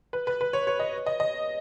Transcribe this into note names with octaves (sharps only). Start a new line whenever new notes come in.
B4
B4
B4
C#5
C#5
D#5
D#5
D#5